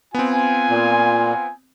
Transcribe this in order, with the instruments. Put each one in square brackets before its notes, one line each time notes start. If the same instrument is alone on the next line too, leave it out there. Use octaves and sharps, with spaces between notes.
[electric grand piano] B3 C4 [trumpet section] F4 G#5
[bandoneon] A#2